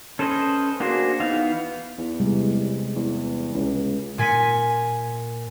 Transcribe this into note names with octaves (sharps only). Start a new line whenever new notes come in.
C#4 A4 B4 C5 D#5
A#3 D4 F#4 G#4 C5
E3 B3 D#4 F5
E2
C3 G3 G#3
E2
C#2
A#2 G#5 B6 C#7 D#7